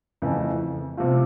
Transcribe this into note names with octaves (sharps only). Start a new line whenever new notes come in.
F2 C#3 E3 A3
C3 F3 A3 C4 F4